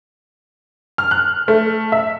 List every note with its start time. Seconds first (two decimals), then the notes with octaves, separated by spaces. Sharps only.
0.98 F6
1.11 F#6
1.48 A3
1.92 E5